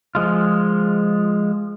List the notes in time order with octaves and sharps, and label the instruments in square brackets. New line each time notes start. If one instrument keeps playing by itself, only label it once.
[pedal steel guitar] F3 G#3 F4